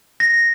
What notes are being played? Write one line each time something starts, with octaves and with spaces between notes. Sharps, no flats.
A#6